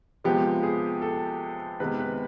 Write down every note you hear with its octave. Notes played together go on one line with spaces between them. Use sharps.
C3 F3 G#3 B3 G4
G#4
A4
C3 D#3 G#3 B3 B4
B4